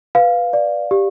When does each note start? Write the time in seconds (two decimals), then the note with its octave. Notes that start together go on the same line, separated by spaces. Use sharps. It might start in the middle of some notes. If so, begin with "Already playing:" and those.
0.15 B4 F5
0.53 D5
0.91 G4